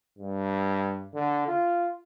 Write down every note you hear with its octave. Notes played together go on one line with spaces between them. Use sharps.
G2
D3
F4